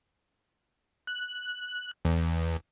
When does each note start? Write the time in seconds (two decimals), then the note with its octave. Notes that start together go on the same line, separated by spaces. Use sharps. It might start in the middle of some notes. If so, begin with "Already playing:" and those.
1.07 F#6
2.05 E2